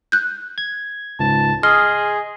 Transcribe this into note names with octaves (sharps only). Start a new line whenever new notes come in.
F#6 G6
G#6
C#2 G#2 A5
G#4 D#5 C6 F6